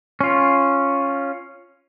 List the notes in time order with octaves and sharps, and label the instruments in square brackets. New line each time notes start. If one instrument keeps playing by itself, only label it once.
[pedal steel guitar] C#4 F4